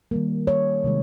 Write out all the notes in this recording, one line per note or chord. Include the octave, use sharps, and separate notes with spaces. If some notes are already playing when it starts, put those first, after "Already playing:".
D#3 G3 A#3
C#5
C3 D#3 G#3